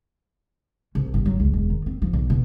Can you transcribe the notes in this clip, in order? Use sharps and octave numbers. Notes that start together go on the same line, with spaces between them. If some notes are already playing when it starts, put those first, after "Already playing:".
C2
G1
F#3
C#2
E1
D#3
C4
F3
B1
B2